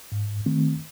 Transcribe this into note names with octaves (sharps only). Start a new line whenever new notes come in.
G#2
D#3 A3 C4